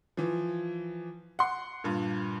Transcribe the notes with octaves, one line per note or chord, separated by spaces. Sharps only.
E3 F3
F#5 C6
G2 A#2